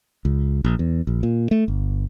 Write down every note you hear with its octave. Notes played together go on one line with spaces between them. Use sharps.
C#2
A#1
E2
A#1
A#2
A3
G1